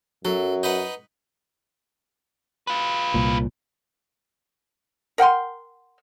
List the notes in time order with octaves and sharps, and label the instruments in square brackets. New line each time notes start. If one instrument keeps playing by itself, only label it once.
[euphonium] F#2 [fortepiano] F#3 [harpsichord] A4
[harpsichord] D#4 B4 F#5
[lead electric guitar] F4 B4
[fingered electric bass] C2 A#2
[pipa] A#4 F#5 G5 C6